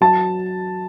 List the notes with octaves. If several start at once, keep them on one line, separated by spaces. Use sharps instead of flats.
F#3 A5